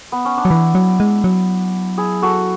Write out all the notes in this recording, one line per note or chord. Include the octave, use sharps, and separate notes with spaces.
B3
C#4
D4
F#3
E3 E4
F#3
G#3
F#3
E4 G#4
F#4 A4